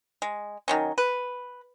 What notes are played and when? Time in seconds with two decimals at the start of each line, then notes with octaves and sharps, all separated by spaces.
0.22 G#3
0.68 D#3 F#3 C#4
0.98 B4